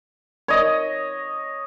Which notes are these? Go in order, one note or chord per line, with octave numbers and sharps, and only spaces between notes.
C#5 D#5